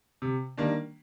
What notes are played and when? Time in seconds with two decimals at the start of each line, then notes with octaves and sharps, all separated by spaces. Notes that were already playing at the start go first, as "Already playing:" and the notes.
0.22 C3
0.58 D#3 G3 A#3 D4